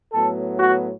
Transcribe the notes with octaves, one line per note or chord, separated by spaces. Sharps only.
A2 F#3 B3 A4
F#4